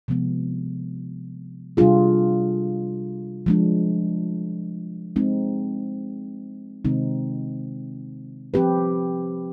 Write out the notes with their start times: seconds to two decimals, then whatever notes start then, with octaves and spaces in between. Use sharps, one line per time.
0.08 C3 F3 G#3 B3
1.77 C3 G3 D4 F4 G#4
3.46 F3 G#3 D4
5.16 G#3 C4 D#4
6.85 C3 D#3 G#3 C4 D#4
8.54 F3 C4 G4 B4